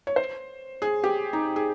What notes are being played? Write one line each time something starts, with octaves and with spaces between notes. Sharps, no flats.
C#5
C5
G#4
G4
D#4
G#4